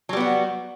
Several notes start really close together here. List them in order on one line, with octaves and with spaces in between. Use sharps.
F#3 G3 B3 F#4